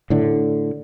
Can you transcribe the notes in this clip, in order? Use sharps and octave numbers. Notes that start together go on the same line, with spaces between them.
A2 D3